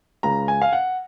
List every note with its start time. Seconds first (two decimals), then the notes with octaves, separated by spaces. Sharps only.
0.23 C#2 C#3 A#5
0.48 G#5
0.62 F5
0.73 F#5